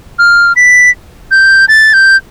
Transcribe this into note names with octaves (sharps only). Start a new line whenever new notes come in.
F6
B6
G6
A6
G6